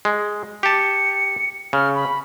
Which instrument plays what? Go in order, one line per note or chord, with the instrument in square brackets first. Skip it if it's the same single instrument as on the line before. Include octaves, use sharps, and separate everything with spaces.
[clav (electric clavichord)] G#3
[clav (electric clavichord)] G4 A5 [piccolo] C#7
[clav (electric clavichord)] C#3 [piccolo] F6
[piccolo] B5